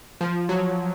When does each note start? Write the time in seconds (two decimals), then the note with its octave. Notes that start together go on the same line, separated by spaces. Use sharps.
0.21 F3
0.49 F#3